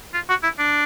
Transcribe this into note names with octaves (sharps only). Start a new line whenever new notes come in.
F4
F#4
E4
D4